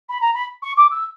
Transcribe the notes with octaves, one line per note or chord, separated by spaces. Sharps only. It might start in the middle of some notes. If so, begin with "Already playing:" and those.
B5
A#5
B5
C#6
D6
E6